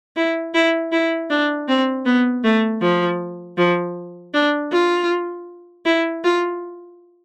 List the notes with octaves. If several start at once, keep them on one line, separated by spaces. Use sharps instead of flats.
E4
E4
E4
D4
C4
B3
A3
F3
F3
D4
F4
E4
F4